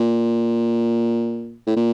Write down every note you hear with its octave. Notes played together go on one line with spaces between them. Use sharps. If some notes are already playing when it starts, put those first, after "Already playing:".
Already playing: A#2
A2
A#2